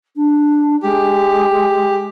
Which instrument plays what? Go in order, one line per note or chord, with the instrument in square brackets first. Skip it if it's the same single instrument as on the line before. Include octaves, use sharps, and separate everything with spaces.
[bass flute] D4
[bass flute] G#3 [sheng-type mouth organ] G4